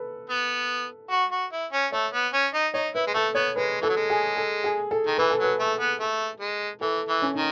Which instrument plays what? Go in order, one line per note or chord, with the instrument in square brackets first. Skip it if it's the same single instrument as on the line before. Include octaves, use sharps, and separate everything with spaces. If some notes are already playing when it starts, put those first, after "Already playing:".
Already playing: [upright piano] A4 B4
[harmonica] B3
F#4
F#4
E4
C#4
[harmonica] A3 [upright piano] C#5
[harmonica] B3
C#4
D#4
[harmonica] D#4 [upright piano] C#5
[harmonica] E4 [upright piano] B4
[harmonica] G#3
[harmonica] A3 [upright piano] A4
[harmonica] B3 [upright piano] C#5
[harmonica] G#3 [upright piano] B4
[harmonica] E3 [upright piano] A4
[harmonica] F#3
G#3
[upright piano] G#4
A4
G#4
A4
[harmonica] D#3
[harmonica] E3 [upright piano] B4
[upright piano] A4
[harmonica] F#3 [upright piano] B4
[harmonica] A3
B3
A3
G#3
[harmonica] E3 [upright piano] A4
[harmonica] E3
[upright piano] C#4
[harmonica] D#3 [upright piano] D#4